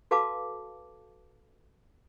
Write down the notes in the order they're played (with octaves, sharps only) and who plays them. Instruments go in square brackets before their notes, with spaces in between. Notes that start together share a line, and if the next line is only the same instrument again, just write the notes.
[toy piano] F#4 A4 B4 F5 A5 D6